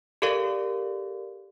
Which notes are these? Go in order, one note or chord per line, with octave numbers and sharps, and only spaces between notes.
G4 A4 A#4 D5 F5